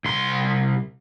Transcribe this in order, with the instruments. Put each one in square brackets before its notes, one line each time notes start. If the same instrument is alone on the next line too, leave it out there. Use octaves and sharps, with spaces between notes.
[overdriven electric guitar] C2 C6